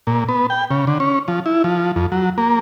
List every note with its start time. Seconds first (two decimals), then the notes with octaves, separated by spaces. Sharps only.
0.07 A#2
0.29 B3
0.50 G5
0.71 C#3
0.87 D3
1.00 C#4
1.28 F3
1.46 E4
1.64 F3
1.96 F2
2.12 F#3
2.38 A#3